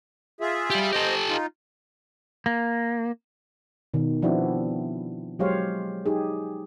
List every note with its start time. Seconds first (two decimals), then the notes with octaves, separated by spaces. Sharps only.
0.41 F4 G#4 E5
0.70 G3 G4
0.93 G4 A4 C5 D#5
1.29 D#4 F4
2.46 A#3
3.94 B2 D#3
4.22 F3 B3 C4 D4 E4 F#4
5.39 F#3 G#3 G4 C5 C#5 F5
6.06 D#4 G4 G#4